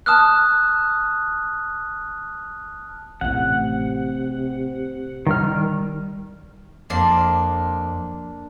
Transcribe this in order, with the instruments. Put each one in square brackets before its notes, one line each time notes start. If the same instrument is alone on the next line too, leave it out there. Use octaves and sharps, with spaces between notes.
[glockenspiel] A5 D#6 F6 F#6
[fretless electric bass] A1 A2 [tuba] C3 [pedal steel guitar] F#5
[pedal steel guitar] D#3 F6 [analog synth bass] G3
[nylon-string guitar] F2 [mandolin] A#3 D4 C6